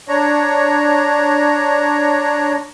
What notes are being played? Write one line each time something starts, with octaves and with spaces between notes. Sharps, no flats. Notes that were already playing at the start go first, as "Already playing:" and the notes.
D4 C#5 A#5